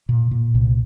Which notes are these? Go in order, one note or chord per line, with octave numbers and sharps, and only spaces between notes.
A#2
A#2
C2